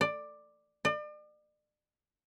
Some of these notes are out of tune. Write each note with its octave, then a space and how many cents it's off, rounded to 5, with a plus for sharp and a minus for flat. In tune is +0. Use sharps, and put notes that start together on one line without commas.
D5 +10
D5 +40